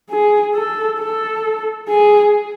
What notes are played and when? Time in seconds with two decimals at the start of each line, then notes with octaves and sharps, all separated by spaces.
0.10 G#4
0.55 A4
0.99 A4
1.89 G#4